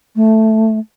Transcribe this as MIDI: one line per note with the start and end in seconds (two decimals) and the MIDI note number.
0.16 0.79 57